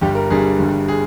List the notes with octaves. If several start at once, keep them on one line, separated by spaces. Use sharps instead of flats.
G1 G2 G3 G4
A#4
G1 G2 G3 G#4
G1 G2 G3
G#4